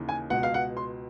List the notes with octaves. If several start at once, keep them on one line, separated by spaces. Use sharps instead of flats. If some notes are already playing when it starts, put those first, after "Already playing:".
Already playing: D#2 C#3 E3
G#5
C#2 B2 F#5
F5
F#5
C6